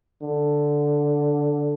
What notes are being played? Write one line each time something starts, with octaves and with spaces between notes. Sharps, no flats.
D3